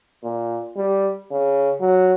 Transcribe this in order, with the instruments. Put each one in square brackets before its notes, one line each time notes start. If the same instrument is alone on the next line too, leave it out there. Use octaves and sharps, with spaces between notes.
[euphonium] A#2
G3
C#3
F#3